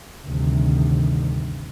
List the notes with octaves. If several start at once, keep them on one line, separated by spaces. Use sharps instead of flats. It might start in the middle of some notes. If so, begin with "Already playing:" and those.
D2 G2 C3 D#3